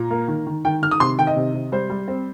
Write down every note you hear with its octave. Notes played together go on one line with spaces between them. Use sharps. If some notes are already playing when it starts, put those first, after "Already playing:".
Already playing: A#2 A#5
A#3
D#3
D#3
D#3 G5
D#3 F6
D#6
C3 C6
D#3 G5
D#5
C3
C3
G3 C5
G3
C4